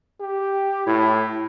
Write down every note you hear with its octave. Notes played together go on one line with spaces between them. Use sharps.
G4
A2 E4